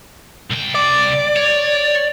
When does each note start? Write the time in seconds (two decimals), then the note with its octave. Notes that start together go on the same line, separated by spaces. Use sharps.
0.50 C2 G5
0.75 D5
1.36 C#5